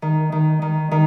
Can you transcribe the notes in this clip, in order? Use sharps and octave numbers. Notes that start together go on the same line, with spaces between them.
D#3
D#3
D#3
D#3